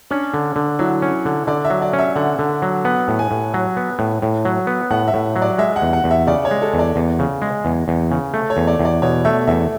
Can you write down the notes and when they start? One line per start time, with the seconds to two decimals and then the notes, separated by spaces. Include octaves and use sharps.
0.11 C#4 D4
0.34 D3
0.56 D3
0.79 F#3 E4
1.02 C#4
1.25 D3
1.47 D3 D5
1.65 E5
1.70 F#3
1.82 D5
1.93 C#4
1.99 E5
2.16 D3 F#5
2.39 D3
2.62 F#3
2.85 B3 F#5
3.08 A2
3.19 G#5
3.31 A2
3.54 F#3
3.77 B3
3.99 A2
4.22 A2
4.45 F#3
4.67 B3
4.91 A2 F#5
5.08 E5
5.14 A2
5.36 F#3
5.42 D5
5.58 G#3 E5
5.76 F#5
5.82 E2
5.93 F#5
6.04 E2
6.11 E5
6.27 C#3 D5
6.45 C#5
6.51 G#3
6.62 A4
6.74 E2
6.79 D5
6.96 E2
7.19 C#3
7.42 G#3
7.65 E2
7.88 E2
8.11 C#3
8.34 A3
8.50 C#5
8.57 E2
8.67 D5
8.79 E2
8.85 D5
9.02 B2 C#5
9.25 A3 E5
9.47 E2 E5